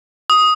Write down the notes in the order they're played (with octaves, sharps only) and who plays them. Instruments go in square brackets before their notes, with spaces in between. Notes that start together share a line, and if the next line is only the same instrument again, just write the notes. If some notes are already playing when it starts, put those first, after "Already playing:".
[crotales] D#6